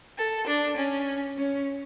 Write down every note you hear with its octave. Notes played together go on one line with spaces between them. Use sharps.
A4
D4
C#4
C#4